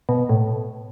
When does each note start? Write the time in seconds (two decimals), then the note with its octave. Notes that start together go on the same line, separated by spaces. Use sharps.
0.09 B2
0.29 A2